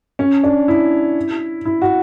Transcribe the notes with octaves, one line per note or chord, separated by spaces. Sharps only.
C#4
D4
E4
E4
F#4